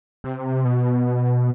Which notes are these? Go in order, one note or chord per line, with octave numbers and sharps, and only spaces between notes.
C3
B2